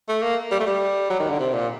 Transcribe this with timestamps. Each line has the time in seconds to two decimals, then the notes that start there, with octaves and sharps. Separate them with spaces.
0.09 A3
0.23 A#3
0.51 G3
0.60 A3
0.66 G3
1.10 F#3
1.19 D#3
1.30 D3
1.39 C3
1.53 A#2